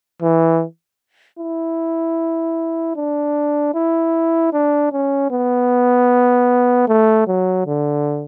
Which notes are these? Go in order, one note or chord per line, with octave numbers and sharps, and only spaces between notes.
E3
E4
D4
E4
D4
C#4
B3
A3
F#3
D3